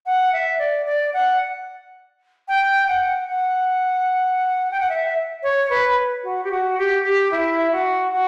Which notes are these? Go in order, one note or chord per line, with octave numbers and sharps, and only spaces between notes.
F#5
E5
D5
D5
F#5
G5
F#5
F#5
G5
F#5
E5
C#5
B4
F#4
G4
F#4
G4
G4
E4
F#4
F#4